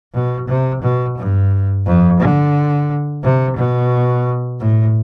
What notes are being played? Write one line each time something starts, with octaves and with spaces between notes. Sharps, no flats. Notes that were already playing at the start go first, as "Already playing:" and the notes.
B2
C3
B2
G2
F2
D3
C3
B2
A2